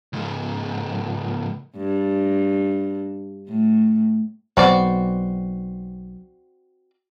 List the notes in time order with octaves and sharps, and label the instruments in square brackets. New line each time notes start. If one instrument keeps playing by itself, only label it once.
[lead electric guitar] C#2 G#2
[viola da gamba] G2
A2
[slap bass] B1 [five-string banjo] C4 F#4 D5